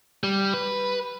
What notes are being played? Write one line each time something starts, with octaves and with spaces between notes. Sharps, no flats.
G3
B4